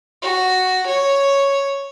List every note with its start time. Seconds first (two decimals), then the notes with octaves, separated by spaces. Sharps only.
0.22 F#4
0.88 C#5